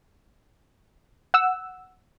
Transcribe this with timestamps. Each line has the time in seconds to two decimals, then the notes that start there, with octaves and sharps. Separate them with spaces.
1.34 F#5 E6